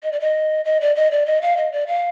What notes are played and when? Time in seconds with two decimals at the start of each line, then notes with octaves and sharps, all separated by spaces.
0.03 D#5
0.12 D5
0.20 D#5
0.65 D#5
0.81 D5
0.95 D#5
1.11 D5
1.26 D#5
1.42 F5
1.57 D#5
1.72 D5
1.87 F5